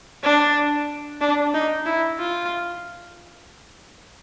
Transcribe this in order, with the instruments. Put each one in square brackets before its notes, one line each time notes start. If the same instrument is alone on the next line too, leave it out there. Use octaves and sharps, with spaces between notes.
[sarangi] D4
D4
D#4
E4
F4